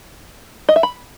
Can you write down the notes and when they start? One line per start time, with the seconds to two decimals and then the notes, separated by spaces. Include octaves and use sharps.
0.69 D#5
0.76 E5
0.83 B5